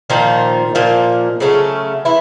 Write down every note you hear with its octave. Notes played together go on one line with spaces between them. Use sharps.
A#2 D#3 F3 A#3 D#4
A#2 F3 A#3
C#3 F#3 A3 C#4
E3 E4